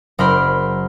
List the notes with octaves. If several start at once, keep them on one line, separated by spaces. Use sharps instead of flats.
F#1 A#4 C5 B5 C6